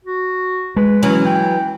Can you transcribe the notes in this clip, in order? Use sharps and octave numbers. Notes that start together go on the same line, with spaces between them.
F#4
G#3 B4
E3 F#3 C#4
G5